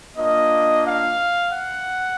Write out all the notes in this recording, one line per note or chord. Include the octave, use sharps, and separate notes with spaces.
A#3 D4 F4 D#5
F5
F#5